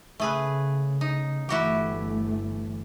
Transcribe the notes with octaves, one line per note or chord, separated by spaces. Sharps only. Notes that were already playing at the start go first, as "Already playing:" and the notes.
C#3 A3 G#4 B4
D#4
G1 E3 A3 E4 F#4 G4